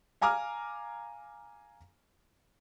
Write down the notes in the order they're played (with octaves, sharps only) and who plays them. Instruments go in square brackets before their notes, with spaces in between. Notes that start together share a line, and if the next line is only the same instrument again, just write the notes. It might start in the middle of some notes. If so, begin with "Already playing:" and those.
[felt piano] F5 G#5 A#5 D6 F6